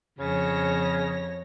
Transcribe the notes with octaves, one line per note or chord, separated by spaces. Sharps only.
F2 C#3 C#5 A#6